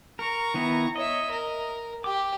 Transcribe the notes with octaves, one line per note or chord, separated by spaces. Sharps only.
A#4 A#5 C#6
D#3 B3 E4
C#5 D#5 E5
A#4
G4 D6